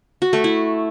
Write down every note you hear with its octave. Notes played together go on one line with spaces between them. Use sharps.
F#4
A3
E4